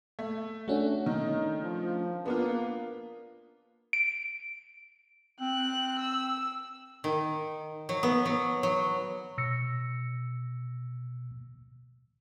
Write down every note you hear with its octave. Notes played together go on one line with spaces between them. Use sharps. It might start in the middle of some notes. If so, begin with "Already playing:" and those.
A3
A3 C#4 D4 F#4
D#3 D#4
F3
A#3 B3 D4 F4
D7
C4 F#6
E6
D#3
F#3
B3
F#3
F#3
B2 E6 A#6 C#7